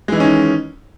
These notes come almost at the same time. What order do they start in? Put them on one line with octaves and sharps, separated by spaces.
G#3 E3 D#4 C#4 D#3